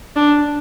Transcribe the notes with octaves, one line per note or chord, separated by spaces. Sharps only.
D4